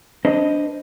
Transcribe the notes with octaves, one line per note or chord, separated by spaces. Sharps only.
D4 B4 C5 D#5